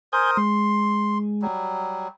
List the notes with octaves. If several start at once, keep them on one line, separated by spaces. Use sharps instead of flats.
A#4 C5 G#5 D#6 G6
G#3 C6
F#3 G3